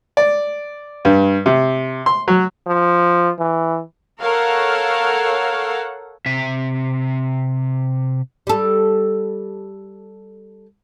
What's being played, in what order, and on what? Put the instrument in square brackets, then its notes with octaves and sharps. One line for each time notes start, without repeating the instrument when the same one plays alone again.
[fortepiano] D5
G2
C3
C6
F#3
[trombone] F3
E3
[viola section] A4 A#4 C#5 F5 F#5
[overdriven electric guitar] C3 E5
[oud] G3 A4